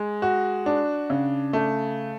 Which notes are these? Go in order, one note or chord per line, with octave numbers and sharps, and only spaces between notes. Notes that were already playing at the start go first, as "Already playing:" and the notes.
Already playing: G#3
F#4
D4
C#3
A3